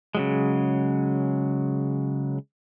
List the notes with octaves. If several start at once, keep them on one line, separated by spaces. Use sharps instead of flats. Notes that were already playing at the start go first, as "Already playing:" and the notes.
C#3 F#3 G#3